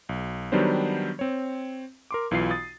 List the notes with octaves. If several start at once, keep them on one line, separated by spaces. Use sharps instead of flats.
B1
D#3 F#3 G3 B3 D4 C5
C4 C#5
A#4 C6 D6
B1 E3 F4 C7
D#6 A6